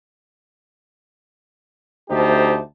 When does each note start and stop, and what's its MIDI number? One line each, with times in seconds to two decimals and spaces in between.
2.09 2.58 38
2.09 2.58 57
2.09 2.58 63
2.09 2.58 67
2.09 2.58 72
2.09 2.58 81